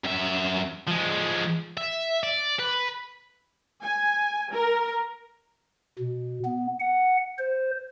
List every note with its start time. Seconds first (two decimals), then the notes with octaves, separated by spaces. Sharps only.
0.04 F#2 E5
0.87 F3 G#3
1.77 E5
2.23 D5
2.59 B4
3.82 G#5
4.52 A#4
5.98 B2
6.45 B3
6.80 F#5
7.39 C5